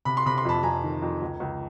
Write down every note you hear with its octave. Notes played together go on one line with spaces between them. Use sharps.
C3 B5
C6
C3 B5
C6
F2 A5 B5
F2 G#5 A#5
D#3
F2
C#2
C#2